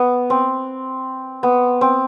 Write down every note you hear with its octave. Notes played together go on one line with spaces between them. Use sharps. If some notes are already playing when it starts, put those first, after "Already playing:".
Already playing: B3
C4
B3
C4